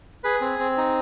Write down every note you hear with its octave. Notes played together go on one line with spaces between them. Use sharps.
G#4 B4
C4
C4
D#4